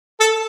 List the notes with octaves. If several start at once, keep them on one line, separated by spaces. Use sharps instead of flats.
A4